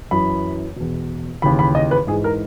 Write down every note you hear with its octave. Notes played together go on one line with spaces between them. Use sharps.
F#2 E3 B5
E2 B2
D#2 C#3 E3 B5
B5
D#5
B4
G#2 E3 G#4
A#4